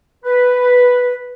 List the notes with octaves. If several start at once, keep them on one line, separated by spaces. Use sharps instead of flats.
B4